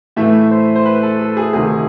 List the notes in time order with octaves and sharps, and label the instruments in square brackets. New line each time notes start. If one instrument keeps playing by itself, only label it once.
[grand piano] A2 E3 A3 E5
C5
C5
B4
A4
A4
G#4
D2 C3 D#3 G#4